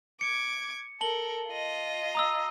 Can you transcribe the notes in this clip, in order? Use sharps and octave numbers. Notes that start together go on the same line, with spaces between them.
D6 G#6 C#7
A4 A#4 A5 F#7 G7
F4 D#5
A#5 D#6 E6